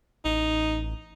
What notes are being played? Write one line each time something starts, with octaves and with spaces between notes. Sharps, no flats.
A1 D#4